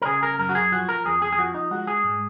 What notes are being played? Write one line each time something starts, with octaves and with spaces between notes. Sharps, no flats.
A#4
C#3 G#4
A#4
F#2 A#4
F#4
G#4
F3 F#4
A#4
F2 G#4
G#4
G#4
F3 F#4
D#4
G#3 F#4
G#4
G#2